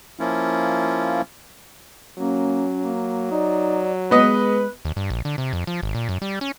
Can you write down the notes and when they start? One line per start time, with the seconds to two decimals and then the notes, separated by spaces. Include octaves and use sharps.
0.20 F3 A#3 C#4 E4 F4
2.18 F#3 A#3 C#4
2.83 A#3
3.31 D#4 D5
4.11 G#3 B3 B4 D#5
4.85 D#2
4.96 G2
5.10 A#1
5.25 D3
5.38 C3
5.53 F2
5.67 F3
5.83 G#1
5.95 A#2
6.09 F#2
6.22 G3
6.41 C#4